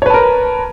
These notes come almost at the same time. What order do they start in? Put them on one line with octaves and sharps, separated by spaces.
C#5 B4 A5 A#4